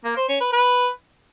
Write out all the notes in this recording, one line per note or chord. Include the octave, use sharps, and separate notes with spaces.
A#3
C5
C#4
B4
B4